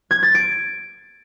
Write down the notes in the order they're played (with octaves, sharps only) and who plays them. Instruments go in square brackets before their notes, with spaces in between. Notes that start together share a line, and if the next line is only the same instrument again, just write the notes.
[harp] G#6
A6
D7